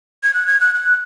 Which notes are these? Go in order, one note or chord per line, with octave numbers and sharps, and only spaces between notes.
G#6
F#6
G#6
F#6
F#6